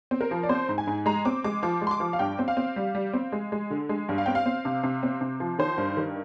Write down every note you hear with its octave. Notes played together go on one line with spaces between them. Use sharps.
C4
A#4
F3
D5
C4 C5
G#2
G#5
G#2
G#3 A#5
C4 D6
G#3 D6
F3 D6
G#3
C6
D6
F3
F5
G2 G5
C4
F5
C4
G3
G3
C4
G#3
G#3
D3
G#3
G2
F5
C4 G5
F5
C4
C3
C3
C4
C3
F3
D#3 C5
G2
D#3